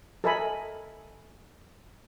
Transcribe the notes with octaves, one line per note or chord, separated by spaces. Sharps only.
A4 A#4 D#5 E5 G#5 B5